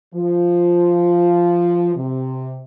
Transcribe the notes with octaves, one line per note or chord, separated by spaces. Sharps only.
F3
C3